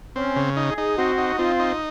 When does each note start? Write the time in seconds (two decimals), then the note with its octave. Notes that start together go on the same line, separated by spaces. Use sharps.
0.16 C4 C#4
0.36 C#3
0.56 D#4
0.70 G#4
0.78 D#4
0.98 C4 F#4
1.18 D#4
1.38 C4 F4
1.60 D#4